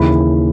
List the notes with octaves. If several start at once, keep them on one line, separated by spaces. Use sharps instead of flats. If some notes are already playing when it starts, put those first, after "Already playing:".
Already playing: D#2 C#3 E3 B5